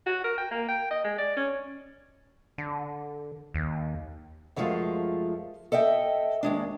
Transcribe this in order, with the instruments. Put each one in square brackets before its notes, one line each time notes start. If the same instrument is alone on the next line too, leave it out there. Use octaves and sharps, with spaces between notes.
[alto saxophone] F#4
A#4
G5
A#3
G5
D#5
G#3
D5
C#4
[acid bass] D3
D#2
[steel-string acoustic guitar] F#2 F3 G#3 A3 F4
A4 D#5 E5 G5
D#2 G#3 D4